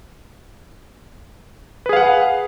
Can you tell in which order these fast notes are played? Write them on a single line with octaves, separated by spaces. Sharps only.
B4 G#4 F5 F#5